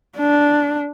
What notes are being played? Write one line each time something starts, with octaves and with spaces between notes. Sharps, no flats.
D4